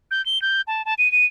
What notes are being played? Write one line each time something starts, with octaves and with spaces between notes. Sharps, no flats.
G6
G7
G6
A5
A5
D#7
D#7